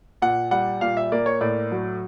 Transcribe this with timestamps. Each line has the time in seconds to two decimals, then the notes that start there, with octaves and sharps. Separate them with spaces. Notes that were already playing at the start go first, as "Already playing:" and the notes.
0.22 A#2 F#5
0.51 G3 F#5
0.81 A#2 F5
0.97 E5
1.12 A#3 D5
1.26 C#5
1.41 A2 D5
1.72 F#3